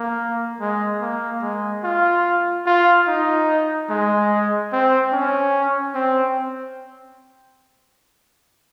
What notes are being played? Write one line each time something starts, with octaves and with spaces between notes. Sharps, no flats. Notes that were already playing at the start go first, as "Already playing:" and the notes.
Already playing: A#3
G#3
A#3
G#3
F4
F4
D#4
G#3
C4
C#4
C4